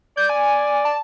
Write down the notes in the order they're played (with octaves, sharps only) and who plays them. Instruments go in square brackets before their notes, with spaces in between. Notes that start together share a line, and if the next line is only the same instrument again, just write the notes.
[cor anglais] D5 [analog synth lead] G6
[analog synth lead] G#5
A5